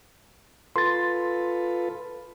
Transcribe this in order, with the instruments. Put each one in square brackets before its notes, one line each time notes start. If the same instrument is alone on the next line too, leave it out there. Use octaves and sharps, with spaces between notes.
[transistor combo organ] F4 A4 B4 [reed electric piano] C6 A6